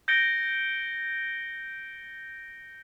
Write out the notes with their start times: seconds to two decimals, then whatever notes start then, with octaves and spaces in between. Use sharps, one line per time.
0.08 G6 A6 A#6 C#7 D7 G7